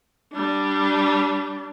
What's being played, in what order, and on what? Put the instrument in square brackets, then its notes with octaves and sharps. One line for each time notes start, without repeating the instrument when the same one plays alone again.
[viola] G3 D4